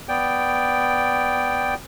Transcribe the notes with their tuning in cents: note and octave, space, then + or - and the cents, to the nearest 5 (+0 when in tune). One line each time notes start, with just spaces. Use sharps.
B3 +0 D5 -10 G5 +0